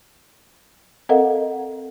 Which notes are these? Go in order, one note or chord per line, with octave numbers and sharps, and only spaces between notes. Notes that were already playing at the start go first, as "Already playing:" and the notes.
C4 A4 A#4 D#5 F5 F#5